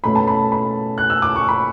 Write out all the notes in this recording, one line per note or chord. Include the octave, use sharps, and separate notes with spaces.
B2 A3 C#4 B5
A5
B5
B5
F#6
E6
D6
C#6
B5